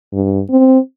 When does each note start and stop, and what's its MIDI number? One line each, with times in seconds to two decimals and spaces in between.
0.13 0.41 43
0.50 0.78 60